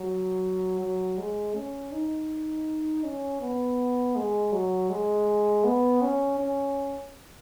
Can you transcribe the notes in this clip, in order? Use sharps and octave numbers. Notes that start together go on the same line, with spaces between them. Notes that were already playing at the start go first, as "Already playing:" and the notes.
Already playing: F#3
F#3
G#3
C#4
D#4
C#4
B3
G#3
F#3
G#3
B3
C#4
C#4